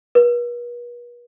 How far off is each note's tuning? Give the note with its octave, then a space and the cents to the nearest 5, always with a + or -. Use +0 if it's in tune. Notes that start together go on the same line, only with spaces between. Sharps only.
B4 -45